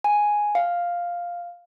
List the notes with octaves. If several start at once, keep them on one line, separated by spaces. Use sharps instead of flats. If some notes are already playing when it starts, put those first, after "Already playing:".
G#5
F5